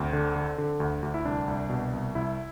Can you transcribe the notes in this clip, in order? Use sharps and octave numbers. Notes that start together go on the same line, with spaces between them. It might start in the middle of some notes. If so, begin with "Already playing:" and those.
Already playing: D2 C4
D3
D3
D3
D2
D2
E4
C2 D4
C2
B2
C2
C2 E4